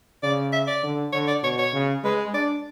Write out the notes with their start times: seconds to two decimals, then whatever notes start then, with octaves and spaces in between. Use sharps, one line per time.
0.23 C#3 D5
0.52 E5
0.67 D5
0.83 D3
1.13 D3 C#5
1.27 D5
1.43 B2 C#5
1.58 C#5
1.73 C#3
2.04 G#3 B4
2.34 D4 D5